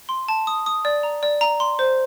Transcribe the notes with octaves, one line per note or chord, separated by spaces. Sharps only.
C6
A5
D#6
D#6
D5
A#5
D5
A#5
C6
C5